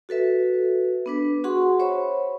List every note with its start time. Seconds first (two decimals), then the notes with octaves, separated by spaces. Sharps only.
0.09 F#4 A4 B4 E5
1.06 B3 D4 B4
1.44 F#4 G#4 F#5 C6 C#6
1.80 C5 C#5 E5 B5 C#6